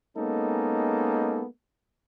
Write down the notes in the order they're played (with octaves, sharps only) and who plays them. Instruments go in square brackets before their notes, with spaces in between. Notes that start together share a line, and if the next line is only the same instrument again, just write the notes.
[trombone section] G#3 A#3 B3 C#4 D#4 A4